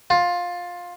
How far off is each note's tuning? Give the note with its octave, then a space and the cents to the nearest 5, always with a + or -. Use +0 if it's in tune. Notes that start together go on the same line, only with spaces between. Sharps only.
F4 +15